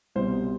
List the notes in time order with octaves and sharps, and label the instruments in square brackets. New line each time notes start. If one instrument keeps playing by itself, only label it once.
[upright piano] C2 B2 G3 C5